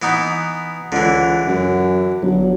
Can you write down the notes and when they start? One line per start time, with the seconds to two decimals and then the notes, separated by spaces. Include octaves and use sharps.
0.02 E3 B3 D#4
0.92 C#2 D3 E3
1.48 F#2
2.23 G1 F#3